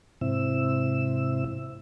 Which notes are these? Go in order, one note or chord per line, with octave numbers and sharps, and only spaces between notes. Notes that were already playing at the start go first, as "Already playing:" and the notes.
G#2 C3 C4 E4 E6